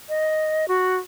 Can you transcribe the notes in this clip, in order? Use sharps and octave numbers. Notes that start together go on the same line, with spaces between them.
D#5
F#4